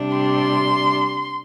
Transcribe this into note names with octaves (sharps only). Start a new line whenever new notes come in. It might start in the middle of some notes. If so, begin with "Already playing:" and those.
Already playing: C3 G3 D4
C6